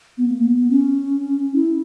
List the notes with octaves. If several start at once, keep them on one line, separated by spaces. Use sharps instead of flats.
B3
A#3
B3
B3
C#4
E4